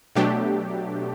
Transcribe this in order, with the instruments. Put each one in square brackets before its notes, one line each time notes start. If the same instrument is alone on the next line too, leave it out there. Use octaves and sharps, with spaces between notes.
[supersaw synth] B2 F#3 A3 D4 G4